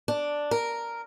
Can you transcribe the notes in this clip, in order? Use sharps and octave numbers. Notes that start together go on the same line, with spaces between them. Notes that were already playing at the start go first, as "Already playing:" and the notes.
D4
A#4